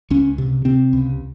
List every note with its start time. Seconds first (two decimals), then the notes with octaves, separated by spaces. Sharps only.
0.10 C#2 C#4
0.38 C3
0.65 C3 C4
0.93 C#2